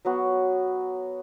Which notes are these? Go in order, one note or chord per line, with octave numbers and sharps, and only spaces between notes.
F#3 B3 F#4